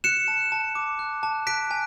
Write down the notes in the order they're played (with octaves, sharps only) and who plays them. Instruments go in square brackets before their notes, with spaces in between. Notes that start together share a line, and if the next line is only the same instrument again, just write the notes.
[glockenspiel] F#6 C#7 E7
A5
A5
D6
F#6
A5
F#6 B6 D7
G#5